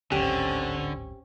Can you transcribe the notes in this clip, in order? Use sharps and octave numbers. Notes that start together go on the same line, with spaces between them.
D1 G#1 D3 C4 C#4 G4